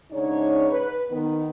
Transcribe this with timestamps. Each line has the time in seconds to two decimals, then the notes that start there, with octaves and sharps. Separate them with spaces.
0.11 G#2 C#3 D4 D#4 C#5
0.69 B4
1.11 D#3 B3